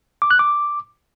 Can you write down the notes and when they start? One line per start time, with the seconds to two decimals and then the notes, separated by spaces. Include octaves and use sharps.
0.22 D6
0.31 F#6
0.39 D6